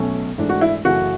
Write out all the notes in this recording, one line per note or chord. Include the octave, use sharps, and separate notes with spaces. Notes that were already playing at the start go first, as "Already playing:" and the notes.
Already playing: B1 B2 A3 C#4
G#2 E3 A3 D4
F#4
E4
F#2 C#3 E3 A3 C#4 F#4